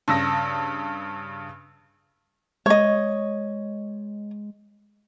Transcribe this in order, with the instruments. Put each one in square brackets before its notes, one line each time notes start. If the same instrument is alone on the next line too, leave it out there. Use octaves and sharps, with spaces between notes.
[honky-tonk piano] G2 C#3 E6 A#6
[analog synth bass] G#3 [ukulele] C#5 D#5